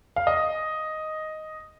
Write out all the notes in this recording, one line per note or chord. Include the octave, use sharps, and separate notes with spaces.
F5
D#5